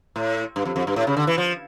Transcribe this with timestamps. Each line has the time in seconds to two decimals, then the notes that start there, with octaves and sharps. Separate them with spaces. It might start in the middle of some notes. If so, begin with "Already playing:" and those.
0.16 A2
0.56 G2
0.65 F2
0.76 F2
0.87 G2
0.96 A2
1.07 C#3
1.17 D3
1.27 E3
1.38 F3